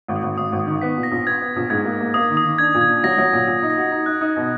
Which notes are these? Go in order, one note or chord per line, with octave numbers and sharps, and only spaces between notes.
G#1
D#6
G#1
G#1 D#6
G#1
D#6
D#3
B3 B6
A#2
A#6
A#1
B3 G#6
B3
A#1
G#2 G#6
A#3
A#3
A#3 D#6
D#3
D#6
D#3
D4 G#6
A#2
G#6
D4
F#3 A#6
F#3
A#2
A#2 A#6
D#4
A#6
F#4
D#4 A#6
D#4 F#6
D#4 F#6
B2